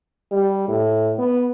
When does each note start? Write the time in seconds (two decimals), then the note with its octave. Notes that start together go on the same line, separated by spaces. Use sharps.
0.32 G3
0.68 A2
1.18 B3